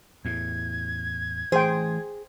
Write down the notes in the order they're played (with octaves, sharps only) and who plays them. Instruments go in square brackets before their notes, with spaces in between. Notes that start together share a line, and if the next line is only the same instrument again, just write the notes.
[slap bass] E2 A2 [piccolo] G#6
[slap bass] E3 A3 [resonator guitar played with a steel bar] G#4 [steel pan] C5 G5